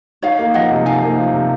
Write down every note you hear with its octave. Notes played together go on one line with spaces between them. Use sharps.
D#4 C#5 F5
A#3
F3 D#5 F#5
C3
D#4 F5 G#5
A#3
F3
C3